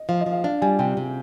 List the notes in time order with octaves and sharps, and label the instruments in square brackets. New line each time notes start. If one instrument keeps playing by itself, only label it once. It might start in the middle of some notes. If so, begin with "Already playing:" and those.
Already playing: [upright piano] D#5
[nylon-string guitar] F3 [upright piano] F5
[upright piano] D#5
[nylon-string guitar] F3
[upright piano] F5
[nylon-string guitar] D4 [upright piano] F5
[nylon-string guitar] G3 [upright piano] G#5
[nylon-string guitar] C3 [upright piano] G5
[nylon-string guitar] C3